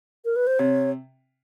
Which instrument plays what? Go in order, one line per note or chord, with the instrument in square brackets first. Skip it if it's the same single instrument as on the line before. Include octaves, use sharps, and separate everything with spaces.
[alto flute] A#4
B4
C5
[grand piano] C3 [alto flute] C#5